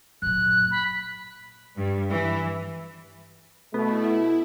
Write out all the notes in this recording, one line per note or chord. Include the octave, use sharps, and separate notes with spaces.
F#2 A#2 F#6
B5
G2
E3
B2 A3 B3 E4